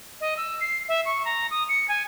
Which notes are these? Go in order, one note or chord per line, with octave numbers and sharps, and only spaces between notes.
D#5
E6
C7
E5
C#6
A#5
D#6
C#7
G#5